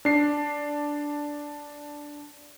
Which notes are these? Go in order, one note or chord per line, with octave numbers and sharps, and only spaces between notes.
D4 C7